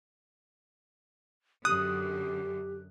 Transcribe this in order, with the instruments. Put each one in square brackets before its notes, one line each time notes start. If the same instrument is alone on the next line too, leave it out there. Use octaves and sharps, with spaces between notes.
[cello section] F#2 D3 [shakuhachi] G4 [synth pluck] D#6 [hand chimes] F#6